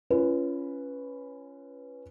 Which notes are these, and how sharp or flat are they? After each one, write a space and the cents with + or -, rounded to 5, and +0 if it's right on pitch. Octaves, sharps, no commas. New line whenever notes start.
C#4 +0 F4 -40 B4 +0